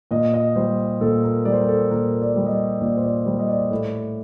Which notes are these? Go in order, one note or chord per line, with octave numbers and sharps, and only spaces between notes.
A#2 D#5
D#5
G3 C5
A#2 A4
A#4
G3 D5
C5
A#4
A4
A#2 A#4
D5
G3
D#5
D5
A#2 D5
C5
D5
G3 C5
D#5
D5
A2